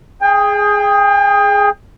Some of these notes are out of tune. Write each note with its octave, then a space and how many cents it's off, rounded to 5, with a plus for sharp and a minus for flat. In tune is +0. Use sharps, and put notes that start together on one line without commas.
G#4 +0 G5 +35